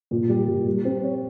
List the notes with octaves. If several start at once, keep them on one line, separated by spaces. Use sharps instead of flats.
A#2
G3
A#2
G3
C4
C#5